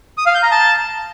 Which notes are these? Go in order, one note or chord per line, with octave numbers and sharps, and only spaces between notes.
D#6
F5
G6
A#5
A5